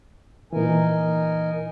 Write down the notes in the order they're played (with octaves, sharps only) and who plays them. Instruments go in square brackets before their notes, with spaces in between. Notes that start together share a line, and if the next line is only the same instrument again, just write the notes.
[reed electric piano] A#2 E3 [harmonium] D#4 A#4 G#5